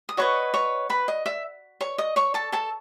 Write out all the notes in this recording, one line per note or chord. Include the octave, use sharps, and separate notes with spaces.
D#6
F#4 B4 C#5 D#5 C#6
C#5 C#6
B4 B5
D#5
E5
C#5 C#6
D#5 D#6
C#5 C#6
A4 A5
A4 A5